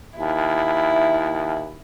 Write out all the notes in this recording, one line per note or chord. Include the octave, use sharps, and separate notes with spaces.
D#2 E4